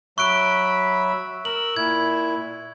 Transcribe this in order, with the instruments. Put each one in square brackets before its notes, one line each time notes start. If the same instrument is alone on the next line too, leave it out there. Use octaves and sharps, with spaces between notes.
[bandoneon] F#3 E5 B5 [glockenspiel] C#6 F#6 D7
[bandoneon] A#4 E6 [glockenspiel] F#7
[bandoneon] A#2 E4 [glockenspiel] G#6